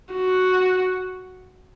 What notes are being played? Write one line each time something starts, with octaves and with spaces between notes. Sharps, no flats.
F#4